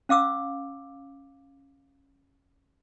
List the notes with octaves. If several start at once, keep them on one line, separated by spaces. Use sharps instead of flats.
C#4 F5 D6 E6